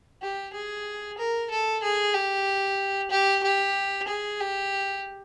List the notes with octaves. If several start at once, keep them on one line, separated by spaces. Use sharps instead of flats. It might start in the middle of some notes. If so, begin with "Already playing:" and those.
G4
G#4
A#4
A4
G#4
G4
G4
G4
G#4
G4